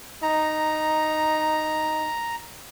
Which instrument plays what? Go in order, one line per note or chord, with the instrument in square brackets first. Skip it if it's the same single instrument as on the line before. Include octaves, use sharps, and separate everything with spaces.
[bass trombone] D#4 [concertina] A#5